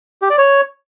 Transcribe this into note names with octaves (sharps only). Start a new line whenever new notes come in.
G4
D5
C#5